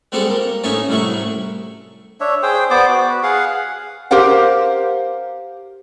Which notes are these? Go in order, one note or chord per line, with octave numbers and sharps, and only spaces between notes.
G3 G#3 C4 F#4 G4 A4
A#3
A2 C#4 D#4 C#5 E5 A5
C2 A2 F#3 E5 C#6
D4 C#5 E5
G#4 C5 G5
B3 C5 D5 D6
F#4
B4
G#4 F5 F#5
G4 A#4 C5 F5 F#5